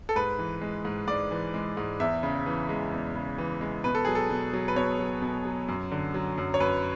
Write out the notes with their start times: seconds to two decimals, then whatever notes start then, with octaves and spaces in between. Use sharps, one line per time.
0.09 A4
0.15 G#2 B4
0.39 E3
0.61 G#3
0.85 G#2
1.08 G#2 D5
1.31 E3
1.54 G#3
1.77 G#2
2.00 E2 E5
2.23 C#3
2.46 E3
2.69 G#3
2.92 E2
3.15 C#3
3.38 E3
3.61 G#3
3.84 B2 B4
3.95 A4
4.05 F#3 G#4
4.15 A4
4.30 B2
4.53 F#3
4.68 B4
4.76 B2 C#5
4.99 F#3
5.22 B2
5.45 F#3
5.68 F#2
5.92 D3
6.14 F#3
6.38 F#2
6.54 C#5
6.60 F#2 B4